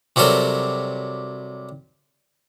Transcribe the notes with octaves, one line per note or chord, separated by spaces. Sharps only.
C3 F#3 G3 A4 A#4